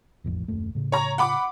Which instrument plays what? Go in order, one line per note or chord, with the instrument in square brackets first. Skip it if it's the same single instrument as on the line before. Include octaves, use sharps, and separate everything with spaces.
[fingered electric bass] E1 A1 F2
D#1 F#2 A3
A2 C#3
[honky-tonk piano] C#5 A#5
F#5 B5 D6